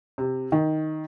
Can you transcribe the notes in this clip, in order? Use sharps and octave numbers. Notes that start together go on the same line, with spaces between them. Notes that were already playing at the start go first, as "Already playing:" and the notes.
C3
D#3